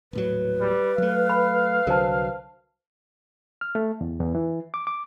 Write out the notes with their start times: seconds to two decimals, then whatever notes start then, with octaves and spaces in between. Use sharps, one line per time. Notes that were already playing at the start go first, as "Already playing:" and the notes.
0.13 D#1 A2 F#3 B4
0.61 G3
0.98 F#3 A3 F5
1.30 B5
1.87 C2 D3 F#3 A#4 C5 A5
3.61 F6
3.75 A3
4.01 E2
4.20 E2
4.35 E3
4.74 D6
4.87 D6